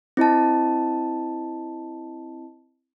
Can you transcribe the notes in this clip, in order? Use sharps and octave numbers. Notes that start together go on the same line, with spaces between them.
C4 E4 D#5 A5